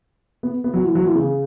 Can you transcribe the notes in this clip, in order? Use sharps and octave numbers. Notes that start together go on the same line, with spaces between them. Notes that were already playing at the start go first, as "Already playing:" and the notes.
B3
B3
F#3
E3
F#3
E3
C#3